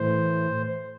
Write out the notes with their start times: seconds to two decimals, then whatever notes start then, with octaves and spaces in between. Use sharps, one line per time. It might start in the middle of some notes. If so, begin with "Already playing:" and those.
Already playing: A2 E3 C5